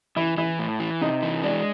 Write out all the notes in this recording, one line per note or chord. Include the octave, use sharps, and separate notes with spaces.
E3 E4
E3 E4
A2
E3
C3 D#4
E3
G#3 D4